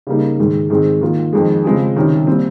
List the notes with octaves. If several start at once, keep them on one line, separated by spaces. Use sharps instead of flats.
C#3 G3 A#3 D#4
G#2 D#3 G#3
G#2 D#3 G#3 C4
D#3 A#3 F4
F2 D#3 G#3
C#3 G#3 C4 F4 G#4
C2 C3 D#3 G3 C#4
A#2 G3 C4